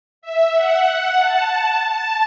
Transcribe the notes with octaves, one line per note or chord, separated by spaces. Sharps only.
E5
F#5
F#5
A5
A5